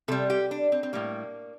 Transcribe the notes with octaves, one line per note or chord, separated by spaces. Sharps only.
C3 G3 A4
G4
D4
C4
C4
A2 G3 A#3